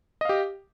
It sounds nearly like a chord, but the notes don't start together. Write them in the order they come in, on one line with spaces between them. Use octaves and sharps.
D#5 F5 G4